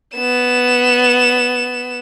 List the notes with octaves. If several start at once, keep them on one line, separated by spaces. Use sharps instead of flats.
B3 E7